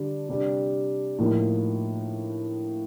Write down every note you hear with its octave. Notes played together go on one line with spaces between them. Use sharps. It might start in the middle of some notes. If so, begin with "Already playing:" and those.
Already playing: D3 G3 D4
C3 G3 D4 G4
A2 F3 A#3 D#4